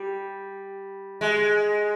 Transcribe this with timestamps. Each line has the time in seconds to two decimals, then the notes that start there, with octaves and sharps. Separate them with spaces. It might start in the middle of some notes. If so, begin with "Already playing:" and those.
Already playing: G3
1.21 G#3